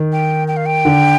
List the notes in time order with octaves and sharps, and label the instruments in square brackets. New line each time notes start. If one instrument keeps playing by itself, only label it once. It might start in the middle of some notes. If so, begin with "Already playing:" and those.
Already playing: [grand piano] D#3
[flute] G5
G5
F5
G5
[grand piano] D3